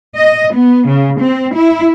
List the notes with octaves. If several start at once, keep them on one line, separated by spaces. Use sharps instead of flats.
D#5
B3
C#3
C4
E4